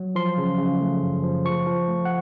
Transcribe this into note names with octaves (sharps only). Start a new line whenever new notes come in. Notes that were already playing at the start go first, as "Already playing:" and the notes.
Already playing: F#3
F3 C6
C#3
C#3
A3
F#2
F3
F3 C#6
F3
A3
F#5